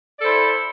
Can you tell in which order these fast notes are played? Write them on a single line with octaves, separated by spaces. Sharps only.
D5 A4 C5 E4